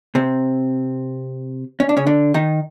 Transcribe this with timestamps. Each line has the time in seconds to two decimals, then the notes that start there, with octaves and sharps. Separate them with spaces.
0.15 C3 C4
1.80 C#4
1.89 D4
1.97 C#3 C#4
2.07 D3 D4
2.34 D#3 D#4